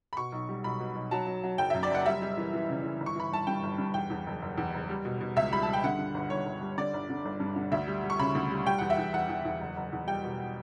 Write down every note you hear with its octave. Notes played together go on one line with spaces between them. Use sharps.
B5
B2 C#6
B1
G3
B1 B5
B2
B1
F#3 A5
F#3
F#3
F#1 G5
F#2 E5
D5
F#1 F#5
G3 E5
G3
E3
E3
C#3
E3
G1
C#6
E3 B5
G1 A5
G2 G5
G1
G2
E2 G5
E2
F#1
F#1
E2
F#1
G3
B2
B2
C#2 E5
G3 B5
G3 A5
G5
D3 F#5
G2
G1
G1 C#5
G1
G3
D3 D5
G1
D3
G1
G2
D3
D2 E5
G3
G3
C#6
C#3 B5
D2
G3
G3 G5
E2 F#5
E5
E2
E2 F#5
E2
E2
F#1
F#1
E2
G3 G5
B2